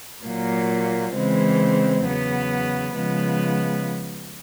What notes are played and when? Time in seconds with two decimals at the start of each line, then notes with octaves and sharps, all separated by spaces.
0.23 A#2 F#3 A#3
1.13 C#3 E3 G#3 C4
2.05 E2 C#3 F#3 B3
2.95 C#3 F3 G#3 B3